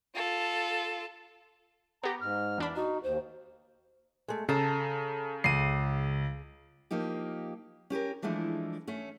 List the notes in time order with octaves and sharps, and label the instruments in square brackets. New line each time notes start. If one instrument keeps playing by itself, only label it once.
[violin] F4 A4
[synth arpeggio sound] B3 G4 [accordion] A#5
[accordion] G#2 F6
[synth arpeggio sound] E2 D4 B5
[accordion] D#4 [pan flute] F#4
[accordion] D#2 [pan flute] C5
[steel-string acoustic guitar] G#3 A3
[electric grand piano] C#3 [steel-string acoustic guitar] A4 A5 A#5
[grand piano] C#2 D#7 [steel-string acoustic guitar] C#3 [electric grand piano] C7
[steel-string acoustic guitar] F3 A#3 D#4 G4
C#4 G4 A4 A#4
E3 F3 G#3 A3 D4 E4
A3 C#4